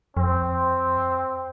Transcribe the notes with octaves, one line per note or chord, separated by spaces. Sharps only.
F2 C4